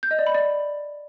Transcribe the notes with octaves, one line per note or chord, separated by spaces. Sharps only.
G6
D#5
D5
B5
D5